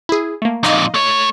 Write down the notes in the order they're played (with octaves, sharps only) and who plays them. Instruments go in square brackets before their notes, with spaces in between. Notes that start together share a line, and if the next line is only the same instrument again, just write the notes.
[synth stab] E4 G#4
A3 A#3
[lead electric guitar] F2 A#2 [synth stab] D#4 D#5 F5
[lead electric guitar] A3 C#5